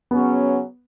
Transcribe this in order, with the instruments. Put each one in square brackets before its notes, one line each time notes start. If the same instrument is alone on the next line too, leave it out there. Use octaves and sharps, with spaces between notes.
[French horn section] C#3 F#3 C#4 [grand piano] B3